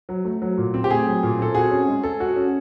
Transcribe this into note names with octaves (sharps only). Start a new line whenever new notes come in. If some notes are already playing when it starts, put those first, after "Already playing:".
F#3
A3
F#3
A#2
C4
G4
A3 G#4
F#3
A#2
C4 A4
F#4 G#4
C#4
G#3
A4
F#4
C#4